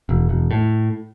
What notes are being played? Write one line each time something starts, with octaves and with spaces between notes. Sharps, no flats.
E1
E1
A2